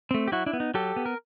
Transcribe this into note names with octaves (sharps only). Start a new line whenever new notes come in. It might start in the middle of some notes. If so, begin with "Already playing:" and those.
A3 C4
G4
F#3 E4 F#4
D4 E4
B3
D#4
F#3 G4 A4
B3
A#4